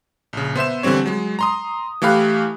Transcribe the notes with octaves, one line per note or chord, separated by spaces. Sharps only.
A#1 C#3
B3 C5 E5 E7
D3 E3 G3 C4 C#5
F#3 G#3
A#5 C6 D#6
E3 A3 G4 F5 B5 F#6